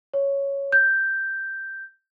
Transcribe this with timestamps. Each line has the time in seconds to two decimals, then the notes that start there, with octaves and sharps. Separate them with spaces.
0.14 C#5
0.72 G6